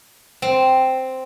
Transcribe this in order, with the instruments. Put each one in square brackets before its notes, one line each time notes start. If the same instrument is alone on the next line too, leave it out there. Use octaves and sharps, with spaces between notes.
[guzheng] C4